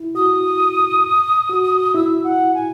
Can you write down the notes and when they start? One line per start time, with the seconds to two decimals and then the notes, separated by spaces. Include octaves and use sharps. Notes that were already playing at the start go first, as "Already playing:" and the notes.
Already playing: E4
0.15 F#4 D#6
1.50 F#4
1.94 E4 E6
2.24 F#5
2.54 G#5